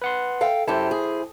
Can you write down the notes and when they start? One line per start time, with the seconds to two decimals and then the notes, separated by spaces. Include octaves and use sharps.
0.02 B4 F#5 C6
0.41 A4 F5 G5
0.68 F#2 E4 G4 A4 C5
0.91 G#4